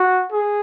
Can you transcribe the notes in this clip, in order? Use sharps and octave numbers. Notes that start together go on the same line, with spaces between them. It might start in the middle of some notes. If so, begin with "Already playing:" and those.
Already playing: F#4
G#4